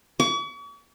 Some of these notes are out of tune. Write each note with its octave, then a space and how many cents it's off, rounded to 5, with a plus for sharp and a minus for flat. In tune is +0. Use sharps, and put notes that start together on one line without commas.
C#6 +45